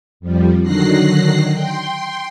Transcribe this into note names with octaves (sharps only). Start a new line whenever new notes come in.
F2 F3 G3
D3 D#3 F#3 F#6 A#6 C7
G5 C6